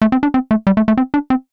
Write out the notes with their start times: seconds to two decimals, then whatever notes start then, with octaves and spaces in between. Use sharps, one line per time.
0.02 A3
0.12 C4
0.23 D4
0.34 C4
0.51 A3
0.67 G3
0.77 A3
0.88 A3
0.97 C4
1.14 D4
1.30 C4